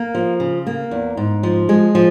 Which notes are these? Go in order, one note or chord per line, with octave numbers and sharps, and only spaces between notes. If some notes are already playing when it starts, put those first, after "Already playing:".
Already playing: A#3
F3
C#3
A#3
E2
G#2
F3
G#3
F3